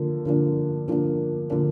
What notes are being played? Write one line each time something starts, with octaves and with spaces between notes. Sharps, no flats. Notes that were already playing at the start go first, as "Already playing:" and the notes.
Already playing: D3 F3 A#3
D3 F3 A#3 D4
D3 F3 A#3 D4
D3 F3 A#3 D4